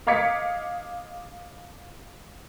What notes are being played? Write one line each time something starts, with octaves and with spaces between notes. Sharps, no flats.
D#5 F5 D6 G#6 B6 C#7